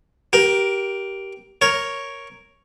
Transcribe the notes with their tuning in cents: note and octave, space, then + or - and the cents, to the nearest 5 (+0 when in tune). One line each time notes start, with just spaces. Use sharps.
G4 -15 A#4 +15
A#4 +0 C#5 +0